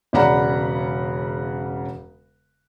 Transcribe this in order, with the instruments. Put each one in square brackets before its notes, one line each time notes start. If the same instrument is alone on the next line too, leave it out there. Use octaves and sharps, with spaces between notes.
[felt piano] E1 C#3 D5 F#5 A#5 B5